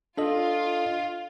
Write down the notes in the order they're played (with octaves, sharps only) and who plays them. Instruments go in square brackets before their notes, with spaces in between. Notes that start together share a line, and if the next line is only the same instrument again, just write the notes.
[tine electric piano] D4 A4 D#5 [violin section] F4